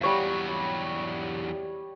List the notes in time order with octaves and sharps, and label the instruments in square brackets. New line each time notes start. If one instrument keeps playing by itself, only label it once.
[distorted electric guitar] E2 F#3 [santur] G3 C#5 F5